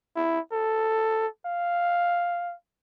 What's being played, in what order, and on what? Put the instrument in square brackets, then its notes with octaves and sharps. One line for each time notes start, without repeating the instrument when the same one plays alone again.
[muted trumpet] E4
A4
F5